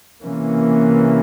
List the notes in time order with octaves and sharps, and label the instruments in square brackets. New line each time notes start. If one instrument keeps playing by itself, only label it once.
[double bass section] C3 E3 A#3 C#4